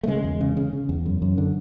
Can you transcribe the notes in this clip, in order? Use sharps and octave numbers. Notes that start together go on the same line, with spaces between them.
A3
C#3 G#3
E2
C#3
C#3
C#3
E2
F#2
F#2
D3